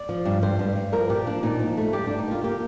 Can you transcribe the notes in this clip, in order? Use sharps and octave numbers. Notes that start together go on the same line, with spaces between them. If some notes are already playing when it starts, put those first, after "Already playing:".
Already playing: D5
F3
G2
G2 C5
G2
G2
F3 A#4
A#2 G4
F3 D4
A#2 D#4
F3
A3
G2 G4
G3 D4
D#4
A#3 F4
A#3 G4